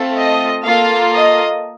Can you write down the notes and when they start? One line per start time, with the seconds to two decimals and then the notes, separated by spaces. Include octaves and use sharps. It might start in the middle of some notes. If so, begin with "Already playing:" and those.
Already playing: A3 C4 F4 A4
0.19 D#5
0.65 A#3 F4 A4 F5
1.11 D#5